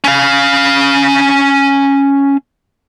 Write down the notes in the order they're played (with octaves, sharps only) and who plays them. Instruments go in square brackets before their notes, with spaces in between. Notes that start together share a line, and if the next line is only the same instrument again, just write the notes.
[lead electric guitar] C#4 F5